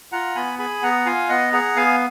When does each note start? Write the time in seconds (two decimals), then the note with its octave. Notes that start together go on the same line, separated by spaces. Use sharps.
0.12 F4 F#5 A#5
0.35 B3 G#5 B5
0.59 G#4 G#5 B5
0.82 B3 F#5 A#5
1.06 F4 F5 G#5
1.29 B3 D#5 F#5
1.53 G#4 F#5 A#5
1.76 B3 F5 G#5